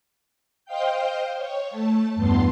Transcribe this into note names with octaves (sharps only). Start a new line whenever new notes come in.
C5 D#5 F5 G5 G6
C#5
A3 A5
E2 G2 B3 A5 C6